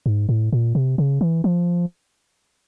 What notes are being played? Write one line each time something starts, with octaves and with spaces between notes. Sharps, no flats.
G#2
A2
A#2
C3
C#3
E3
F3